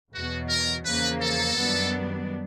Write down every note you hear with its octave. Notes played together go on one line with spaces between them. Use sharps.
E2 B2 F#3 F#4
A#4
E2 C#3 F3 A#3 B4
A4
F#2 D#3 G3 B3 D4